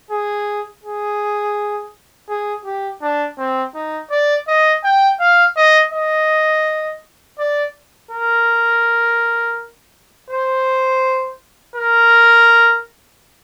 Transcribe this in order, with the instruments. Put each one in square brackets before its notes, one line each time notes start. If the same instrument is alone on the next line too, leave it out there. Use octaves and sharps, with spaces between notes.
[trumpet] G#4
G#4
G#4
G4
D4
C4
D#4
D5
D#5
G5
F5
D#5
D#5
D5
A#4
C5
A#4